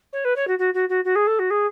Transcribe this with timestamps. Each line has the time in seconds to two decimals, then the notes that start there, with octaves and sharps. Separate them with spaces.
0.13 C#5
0.25 B4
0.36 C#5
0.48 F#4
0.59 F#4
0.74 F#4
0.89 F#4
1.05 F#4
1.15 G#4
1.27 A4
1.39 F#4
1.50 G#4